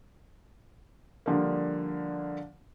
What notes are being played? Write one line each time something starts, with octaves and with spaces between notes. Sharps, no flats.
D3 F3 G3 A#3